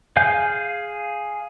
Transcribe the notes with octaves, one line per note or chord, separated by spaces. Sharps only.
G#4 F5 G#5 G6